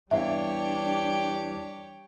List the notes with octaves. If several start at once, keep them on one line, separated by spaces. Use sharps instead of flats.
E2 E3 G3 D4 G4 C#5 E5 F5